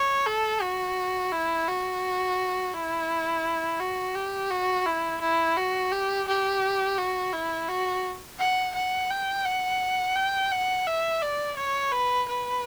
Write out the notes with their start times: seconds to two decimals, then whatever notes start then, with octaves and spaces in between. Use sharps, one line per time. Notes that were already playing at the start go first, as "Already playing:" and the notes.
Already playing: C#5
0.26 A4
0.62 F#4
1.32 E4
1.68 F#4
2.74 E4
3.80 F#4
4.15 G4
4.51 F#4
4.86 E4
5.21 E4
5.57 F#4
5.92 G4
6.27 G4
6.98 F#4
7.33 E4
7.69 F#4
8.39 F#5
8.75 F#5
9.10 G5
9.45 F#5
10.16 G5
10.52 F#5
10.86 E5
11.22 D5
11.57 C#5
11.92 B4
12.28 B4